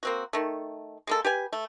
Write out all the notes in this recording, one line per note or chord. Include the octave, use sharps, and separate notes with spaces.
A#3 C4 F#4
D#3 A3
G#3 A#3 A4
G4 B4 G#5
A3